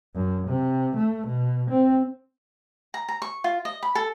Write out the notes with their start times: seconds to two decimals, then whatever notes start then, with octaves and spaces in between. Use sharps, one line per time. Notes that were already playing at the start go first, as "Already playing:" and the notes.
0.15 F#2
0.47 C3
0.96 A3
1.27 B2
1.70 C4
2.94 A#5
3.09 A#5
3.22 C#6
3.44 F4
3.65 D#5
3.83 B5
3.95 A4